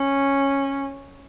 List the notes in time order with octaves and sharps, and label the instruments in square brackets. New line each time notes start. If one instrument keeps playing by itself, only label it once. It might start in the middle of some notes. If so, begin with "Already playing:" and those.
Already playing: [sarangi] C#4